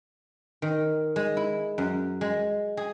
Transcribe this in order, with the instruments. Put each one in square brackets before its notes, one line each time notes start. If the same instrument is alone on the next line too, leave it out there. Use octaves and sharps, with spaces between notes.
[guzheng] D#3
G#3
E4
F#2
G#3
G#4